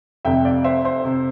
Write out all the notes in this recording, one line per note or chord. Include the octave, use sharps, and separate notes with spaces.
F1 F2 C3 E5 G5
D5 F5
C5 E5
C5 E5
C3